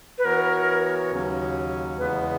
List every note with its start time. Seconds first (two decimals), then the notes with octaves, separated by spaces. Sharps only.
0.18 B4
0.25 E3 B3 F#4 A#4 C#5
1.11 D#2 C#3 F#3 C#4
1.98 E2 C#3 G#3 B3 B4